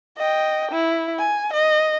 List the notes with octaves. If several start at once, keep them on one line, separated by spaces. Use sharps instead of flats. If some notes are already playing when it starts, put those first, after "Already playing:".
D#5 G5
E4
G#5
D#5